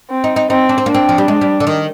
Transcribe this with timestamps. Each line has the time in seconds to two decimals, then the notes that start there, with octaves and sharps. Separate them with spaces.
0.10 C4
0.24 D#4
0.36 D#4
0.50 C4 D#4
0.69 D4
0.78 C4
0.86 A#3 D4
0.95 C4
1.09 F3
1.18 G3
1.28 G#3
1.41 G3
1.60 D3
1.67 D#3